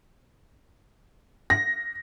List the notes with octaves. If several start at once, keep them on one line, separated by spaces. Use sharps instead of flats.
A#6